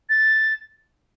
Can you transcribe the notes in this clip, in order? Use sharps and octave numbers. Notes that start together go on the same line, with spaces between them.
A6